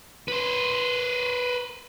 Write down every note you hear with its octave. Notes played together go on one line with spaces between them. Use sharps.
B4 C5